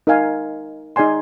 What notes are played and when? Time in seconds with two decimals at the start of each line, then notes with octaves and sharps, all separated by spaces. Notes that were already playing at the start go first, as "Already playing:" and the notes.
0.07 D#4 A#4 F5 G#5
0.96 D#4 G#4 D5 G#5 C6